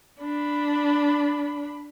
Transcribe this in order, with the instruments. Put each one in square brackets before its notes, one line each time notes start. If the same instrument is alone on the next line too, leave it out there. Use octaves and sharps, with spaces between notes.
[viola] D4 B5